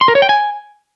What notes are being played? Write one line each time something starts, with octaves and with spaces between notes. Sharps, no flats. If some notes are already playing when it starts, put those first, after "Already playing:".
C6
A#4
C#5
G5
G#5